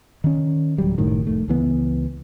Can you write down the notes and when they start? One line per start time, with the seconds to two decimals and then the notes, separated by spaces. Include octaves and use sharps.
0.24 D#3 C#4
0.78 D1 F#3 G3
0.98 F#1 A2 D#3
1.27 F1 A3
1.48 C#2 E3 B3